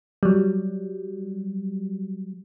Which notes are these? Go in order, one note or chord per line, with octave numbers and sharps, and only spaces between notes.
F#3 G3